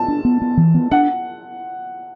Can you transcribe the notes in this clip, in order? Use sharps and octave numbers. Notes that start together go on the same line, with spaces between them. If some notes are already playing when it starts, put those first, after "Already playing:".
Already playing: A5
D4
B3
B3
E3
B3
D4 F#5